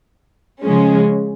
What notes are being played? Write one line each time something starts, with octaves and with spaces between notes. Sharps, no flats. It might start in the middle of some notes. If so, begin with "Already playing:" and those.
C#3 F3 G#3 C#4